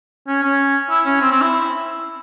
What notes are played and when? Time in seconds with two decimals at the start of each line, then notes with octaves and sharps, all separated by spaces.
0.28 C#4
0.43 C#4
0.90 E4
1.06 C#4
1.21 C4
1.32 C4
1.42 E4